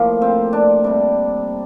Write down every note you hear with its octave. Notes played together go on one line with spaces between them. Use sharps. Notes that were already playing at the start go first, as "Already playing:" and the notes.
Already playing: A2 F3 A#3
C4
D4
C3 G3